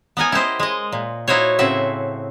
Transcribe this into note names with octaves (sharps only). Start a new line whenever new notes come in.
B3 D#4 A#4 G#5
E4 G4 C5 D#5
G#3 D#5
A#2
D#4 E4 F#4 C5 C#5
A2 C#3 C4 F#4 E5